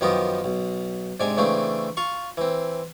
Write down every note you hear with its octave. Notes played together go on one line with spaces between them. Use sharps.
F#2 D#3 F3 B3 G4 D#5
B1
G#2 C3 D4 G#5
C#3 E3 A3 C4 D4
F4 F5 C#6
E3 C4